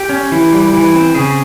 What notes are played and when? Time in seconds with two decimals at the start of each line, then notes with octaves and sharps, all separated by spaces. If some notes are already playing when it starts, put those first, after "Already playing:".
Already playing: G4
0.09 C#4
0.32 E3
0.53 G3
0.73 E3
0.95 C4
1.15 C#3 G#4